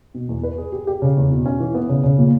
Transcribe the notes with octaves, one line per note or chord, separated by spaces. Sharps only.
B2
E2
B4
G#4
G4
G4
C#3
E2
B2
C#4
E3
B3
C#3
C#3
A#2